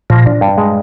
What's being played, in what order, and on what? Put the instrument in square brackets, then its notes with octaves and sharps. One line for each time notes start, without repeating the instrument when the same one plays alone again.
[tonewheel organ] A#2 [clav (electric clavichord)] F3
[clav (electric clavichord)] D4
G2
G#3